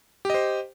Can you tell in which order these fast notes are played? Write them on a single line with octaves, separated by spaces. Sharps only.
G4 D#5 C5